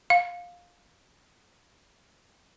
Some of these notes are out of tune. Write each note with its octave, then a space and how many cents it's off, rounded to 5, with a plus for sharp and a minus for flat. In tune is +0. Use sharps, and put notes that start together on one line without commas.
F5 +15